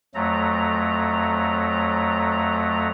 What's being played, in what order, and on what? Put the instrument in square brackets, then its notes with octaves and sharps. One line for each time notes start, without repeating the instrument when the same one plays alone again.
[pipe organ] F2 F#3 A3 A#5